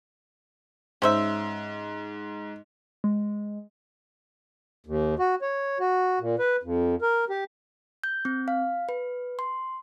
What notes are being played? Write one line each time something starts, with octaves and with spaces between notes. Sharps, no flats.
G#2 C#4 C5 E5
G#3
D#2
F#4
C#5
F#4
A#2
B4
F2
A#4
G4
G6
C4
F5
B4
C6